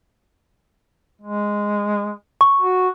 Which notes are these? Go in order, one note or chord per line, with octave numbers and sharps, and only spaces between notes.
G#3
C#6
F#4